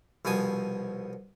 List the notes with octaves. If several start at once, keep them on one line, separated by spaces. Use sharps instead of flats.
C2 B2 F3 G#5 D#6